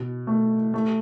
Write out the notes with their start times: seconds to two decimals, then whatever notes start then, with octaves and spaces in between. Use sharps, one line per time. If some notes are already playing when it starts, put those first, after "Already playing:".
Already playing: B2
0.27 A3
0.74 A3